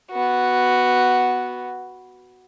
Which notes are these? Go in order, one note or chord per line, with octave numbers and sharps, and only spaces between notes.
B3 F#4